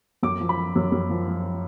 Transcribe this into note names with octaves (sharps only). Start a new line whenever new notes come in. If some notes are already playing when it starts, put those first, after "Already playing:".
F#2 D6
F3
B5
F3
F#2
F#2
F3
F3